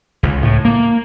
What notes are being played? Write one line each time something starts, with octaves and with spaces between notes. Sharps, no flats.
C#2
A2
A#3